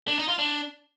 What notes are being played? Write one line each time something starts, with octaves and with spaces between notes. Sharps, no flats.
D4
D#4
F4
D4